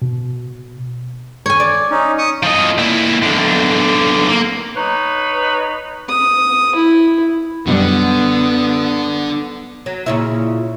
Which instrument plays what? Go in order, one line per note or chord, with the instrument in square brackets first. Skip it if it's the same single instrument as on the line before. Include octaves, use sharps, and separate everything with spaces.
[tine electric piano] B2
[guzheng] C#5 G#5
D5
[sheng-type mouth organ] C#4 D#4
C#6 D#6
[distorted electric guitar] F3 D#5
A#2 E4
B1 D3
A#3
[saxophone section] D#4 B4 C#5 D#5
[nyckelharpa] D#6
E4
[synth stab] F#2 B2 G3 [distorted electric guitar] D3 [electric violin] B3
[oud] F#3
A#2 C#3 E4